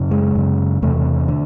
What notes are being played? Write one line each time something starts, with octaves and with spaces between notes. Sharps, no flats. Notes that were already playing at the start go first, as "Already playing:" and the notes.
Already playing: F#2 C#3
G#3
F#2 C#3
E2 C3 A3
D3